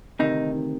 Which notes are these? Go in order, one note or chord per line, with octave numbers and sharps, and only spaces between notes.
D2 C3 D#3 D#4